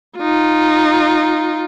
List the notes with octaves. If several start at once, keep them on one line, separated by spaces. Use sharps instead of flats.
D#4 F4